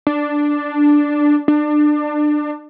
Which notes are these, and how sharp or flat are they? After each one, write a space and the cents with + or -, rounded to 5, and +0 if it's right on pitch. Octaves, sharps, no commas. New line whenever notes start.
D4 +0
D4 +25